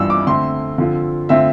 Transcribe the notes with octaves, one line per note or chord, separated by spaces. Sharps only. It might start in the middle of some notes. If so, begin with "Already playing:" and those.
Already playing: G2 E3 G3 D4 F4 E6
D6
D3 A3 C4 C6
D3 F3 C4 F4
D3 A3 C4 F4 E5